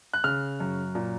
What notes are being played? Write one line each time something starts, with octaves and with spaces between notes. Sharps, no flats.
F#6
C#3 F6
F#2
A#2